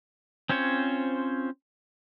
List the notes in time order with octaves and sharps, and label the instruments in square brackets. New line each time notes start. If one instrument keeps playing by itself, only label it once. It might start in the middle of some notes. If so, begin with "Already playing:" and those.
[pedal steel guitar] C4 C#4 F4 C5 C#5